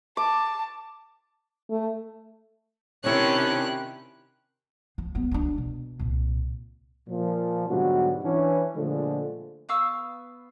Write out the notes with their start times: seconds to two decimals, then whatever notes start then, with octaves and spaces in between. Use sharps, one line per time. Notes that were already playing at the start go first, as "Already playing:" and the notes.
0.17 A5 D6
1.70 A3
3.04 C3 D#3 C#4 D4 E4 G4 C#5 F#6
4.98 F3
5.15 F#3 B3
5.31 F#3 D4
5.58 B2
5.99 C2 A#2
7.08 A#2 F3
7.68 G#2 B2 D3 F#3 G3 F#4
8.24 E3 C#4 D4
8.76 A#2 D3 F3 G#3 A3
9.69 B3 F5 C#6 E6